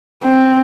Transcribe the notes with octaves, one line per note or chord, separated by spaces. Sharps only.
C4